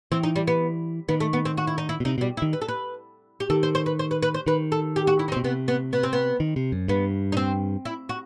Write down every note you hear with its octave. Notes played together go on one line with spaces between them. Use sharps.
E3 C4
D#4
G3
B3
D#3 B3
A3
B3
C4
F#4
E4
D#4
E4
B2
C3 D#4
B2 G3
E4
D#3
B4
A4
B4
G4
D#3 A4
C5
C5
B4
C5
B4
B4
C5
D#3 B4
A4
G4
F#4
E4
D#4
C4
B2
C3 B3
B3
B3
C4
B3
D#3
C3
F#2
G2 B3
D#4
C4
E4
F#4